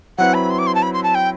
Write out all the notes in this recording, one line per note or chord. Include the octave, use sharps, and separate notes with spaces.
F#3 C4 E4 B4 F#5
B5
C6
D6
C6
A5
B5
C6
A5
G5